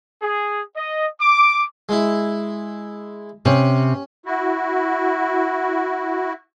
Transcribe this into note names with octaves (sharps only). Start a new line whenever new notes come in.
G#4
D#5
D6
G#3 E4
C3 C#4
E4 F#4